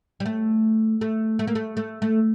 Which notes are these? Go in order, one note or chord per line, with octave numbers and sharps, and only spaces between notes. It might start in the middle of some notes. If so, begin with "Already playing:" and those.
G3
A3
A3
A3
A#3
A3
A3
A3